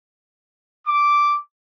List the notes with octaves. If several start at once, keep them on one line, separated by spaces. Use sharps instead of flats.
D6